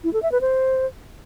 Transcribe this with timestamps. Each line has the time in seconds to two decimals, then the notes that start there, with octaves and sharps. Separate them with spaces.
0.04 E4
0.13 A4
0.23 E5
0.32 B4
0.41 C5